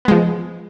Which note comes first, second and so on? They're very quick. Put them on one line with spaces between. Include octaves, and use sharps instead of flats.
B3 G#3 F3